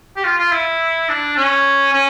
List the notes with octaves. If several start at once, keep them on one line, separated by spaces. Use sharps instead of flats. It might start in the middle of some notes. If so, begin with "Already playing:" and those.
G4
F4
F4
E4
D4
C#4
C#4